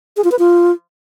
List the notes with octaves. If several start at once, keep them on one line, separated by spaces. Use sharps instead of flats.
G#4
F4
B4
F4